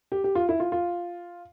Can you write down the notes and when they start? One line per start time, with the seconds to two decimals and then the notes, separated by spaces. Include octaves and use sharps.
0.12 G4
0.24 G4
0.35 F4
0.49 E4
0.60 F4
0.72 F4